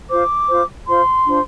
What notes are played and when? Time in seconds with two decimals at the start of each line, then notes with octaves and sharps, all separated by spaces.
0.09 F4 C5 D6
0.48 F4 C5
0.87 F4 C5 C6
1.26 D4 F4 C5